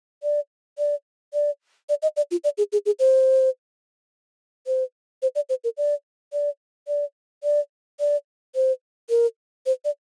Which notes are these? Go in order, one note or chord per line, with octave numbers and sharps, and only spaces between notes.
D5
D5
D5
D5
D#5
D5
F4
D5
G#4
G#4
G#4
C5
C5
C5
D5
C5
A#4
D5
D5
D5
D5
D5
C5
A#4
C5
D5